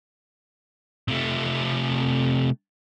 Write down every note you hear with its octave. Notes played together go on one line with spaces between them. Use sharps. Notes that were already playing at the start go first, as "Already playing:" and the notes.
C3 A3